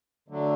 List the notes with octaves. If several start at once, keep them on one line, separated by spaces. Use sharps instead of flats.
D3 F#3 A3 D4